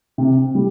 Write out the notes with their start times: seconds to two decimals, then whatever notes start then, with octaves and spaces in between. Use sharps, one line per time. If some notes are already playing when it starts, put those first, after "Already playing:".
0.18 C3
0.55 G3